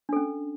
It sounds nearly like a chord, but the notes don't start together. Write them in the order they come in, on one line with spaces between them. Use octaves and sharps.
D4 A4 C#4